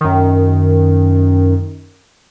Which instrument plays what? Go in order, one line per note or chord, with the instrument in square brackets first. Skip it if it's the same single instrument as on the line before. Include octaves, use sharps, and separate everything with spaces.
[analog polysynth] F#2 D#3